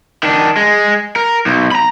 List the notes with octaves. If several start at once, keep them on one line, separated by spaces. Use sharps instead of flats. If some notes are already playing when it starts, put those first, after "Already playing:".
D#3 D4
G#3
A#4
B1
A#5 B5